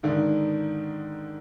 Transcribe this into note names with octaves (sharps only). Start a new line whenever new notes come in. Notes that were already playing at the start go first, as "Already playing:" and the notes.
G#2 D3 D#3